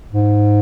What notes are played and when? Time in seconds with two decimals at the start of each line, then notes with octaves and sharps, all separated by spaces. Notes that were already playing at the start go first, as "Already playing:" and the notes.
0.12 G#2